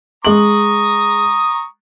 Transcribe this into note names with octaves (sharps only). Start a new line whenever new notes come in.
G#3 A#5 C#6 D#6 F#7